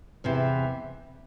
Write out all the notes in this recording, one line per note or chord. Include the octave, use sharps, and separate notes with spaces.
E2 C3 E3